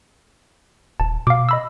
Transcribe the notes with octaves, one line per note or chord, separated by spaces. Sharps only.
D#1 A5
B2 F5 D6
D#5 B5 E6